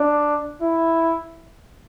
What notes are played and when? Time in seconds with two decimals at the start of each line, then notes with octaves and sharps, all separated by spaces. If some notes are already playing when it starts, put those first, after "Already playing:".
Already playing: D4
0.62 E4